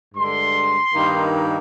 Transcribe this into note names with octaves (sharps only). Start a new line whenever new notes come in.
G2 D3 G#3 C6
G2 D#3 A#3 D#4